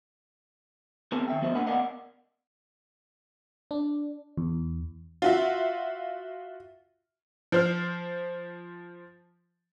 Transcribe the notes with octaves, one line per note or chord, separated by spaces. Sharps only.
B3 C4 G#4 A#4 G#5 A5
D#3 E5 G5
F3 B3 F#4 C5 D#5
A#2 A#3 D4 F#5 G#5 B5
B3 A#4 D5 D#5 F5 F#5
D4
E2
F4 F#4 E5
F3 C5 F6